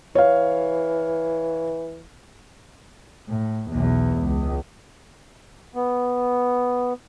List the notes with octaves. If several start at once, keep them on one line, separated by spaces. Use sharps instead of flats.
E3 C#5 F5
A2
B1 E2
C#2
B3